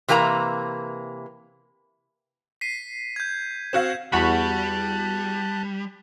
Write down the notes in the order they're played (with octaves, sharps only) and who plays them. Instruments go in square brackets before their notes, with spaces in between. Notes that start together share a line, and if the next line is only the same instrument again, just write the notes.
[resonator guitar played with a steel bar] C3 E3 A#3 G#5 A#5
[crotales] B6 C7 D#7
G6 G#6
[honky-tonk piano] C4 F#4 F5 [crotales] G#6 E7
[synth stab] E2 F#4 B5 [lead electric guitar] G3 [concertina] A5 F#6